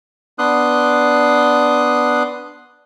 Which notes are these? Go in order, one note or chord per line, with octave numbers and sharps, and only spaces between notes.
B3 D4 C6 D#6 F#6